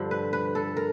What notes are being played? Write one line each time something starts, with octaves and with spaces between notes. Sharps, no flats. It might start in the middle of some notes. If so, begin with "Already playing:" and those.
Already playing: G2 D3 F3
B4
B4
A4
A#4